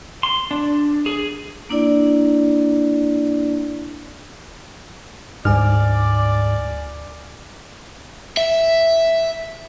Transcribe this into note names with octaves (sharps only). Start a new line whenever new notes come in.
C6
D4
G#4
A#3 D4 E4 D5
D2 G#2 D5 G#5 F6
E5